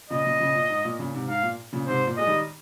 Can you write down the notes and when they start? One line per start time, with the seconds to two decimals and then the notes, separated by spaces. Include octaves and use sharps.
0.10 A#2 C#3 D#5
0.25 A#2 C#3
0.40 A#2 C#3
0.55 A#2
0.70 G#2
0.85 A#2
0.99 A#2 C#3
1.14 G#2 C3
1.28 G#2 F5
1.43 A#2
1.73 A#2 C#3
1.87 G#2 C3 C5
2.07 A#2
2.17 G#3 D#5
2.26 D#3 G3